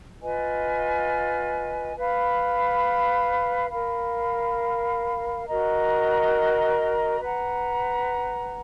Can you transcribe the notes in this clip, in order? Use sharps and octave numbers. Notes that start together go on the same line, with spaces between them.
F4 B4 D#5 G#5
B4 F5 B5
A#4 F5 B5
F#4 A#4 D#5 A#5
B4 F#5 A#5